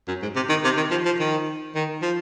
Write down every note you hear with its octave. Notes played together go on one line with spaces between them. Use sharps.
F#2
G#2
C3
D#3
C3
D#3
F3
F3
D#3
D#3
F3